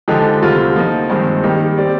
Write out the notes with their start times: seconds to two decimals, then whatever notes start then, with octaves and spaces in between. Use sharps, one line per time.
0.08 D3 F3 G#3 D#4 G4
0.42 D2 C3 G3 C4 F4
0.76 F3 A#3 D#4
1.10 G2 D#3 G#3 C4 D#4
1.43 D#3 G3 A#3 D#4 G4
1.77 G3 C4 G4 D5